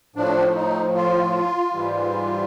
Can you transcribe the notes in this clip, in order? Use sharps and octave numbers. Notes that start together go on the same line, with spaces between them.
A2 F3 D4
D#4
F4
G#2 E3 G3